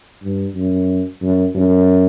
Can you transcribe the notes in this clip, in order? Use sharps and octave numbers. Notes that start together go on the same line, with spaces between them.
G2
F#2
F#2
F#2